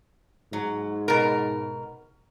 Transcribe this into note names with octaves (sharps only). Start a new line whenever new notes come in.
G#2 F#3
B2 A#4